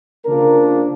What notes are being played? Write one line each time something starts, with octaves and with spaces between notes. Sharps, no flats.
C#3 F3 A#3 D4 F4 A#4